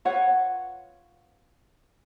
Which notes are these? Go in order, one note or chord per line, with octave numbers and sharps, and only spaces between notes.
F4 B4 C#5 F#5